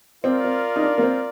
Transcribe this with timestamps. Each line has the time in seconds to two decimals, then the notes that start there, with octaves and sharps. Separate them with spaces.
0.24 C4 F4 A#4 D5
0.44 C4
0.76 D#4
0.83 D4
0.98 A#3
1.03 C4